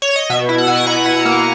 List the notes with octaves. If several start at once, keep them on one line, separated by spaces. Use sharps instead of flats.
C#5
D#5
B2 E5
E4
F#5
B2 G#5
F#5
B2 A#5
E4
A#3